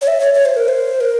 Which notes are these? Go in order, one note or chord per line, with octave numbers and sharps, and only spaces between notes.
C#5
E5
C#5
C#5
C5
A#4
C5
A#4